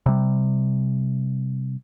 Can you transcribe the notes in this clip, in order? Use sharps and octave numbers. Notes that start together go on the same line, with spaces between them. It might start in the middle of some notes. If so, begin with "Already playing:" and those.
C3 G3